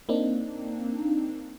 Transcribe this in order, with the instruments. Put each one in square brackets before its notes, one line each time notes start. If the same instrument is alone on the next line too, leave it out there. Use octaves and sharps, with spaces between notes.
[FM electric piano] A#3 C4 D4 D#4